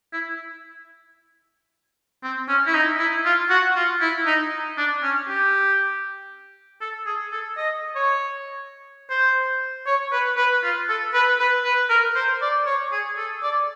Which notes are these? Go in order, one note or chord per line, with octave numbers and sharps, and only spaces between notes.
E4
C4
C#4
E4
D#4
E4
F4
F#4
F4
E4
D#4
D4
C#4
G4
A4
G#4
A4
D#5
C#5
C5
C#5
B4
B4
F4
A4
B4
B4
B4
A#4
C5
D5
C#5
G#4
A4
D5